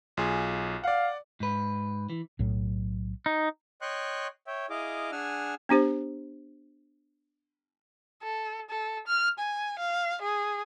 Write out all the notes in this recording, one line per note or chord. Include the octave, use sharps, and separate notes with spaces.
B1 F4 G#4
D5 F5 F#5
G#2 B4
E3
B1 A2 F#3
D#4
C#5 D#5 G5 C6 C#6 F#6
C#5 E5 G5
E4 G#4 D#5 F5 D6
D4 G#4 F#5 G#5 E6 F6
B3 D4 G4 C5
A4
A4
F6
G#5
F5
G#4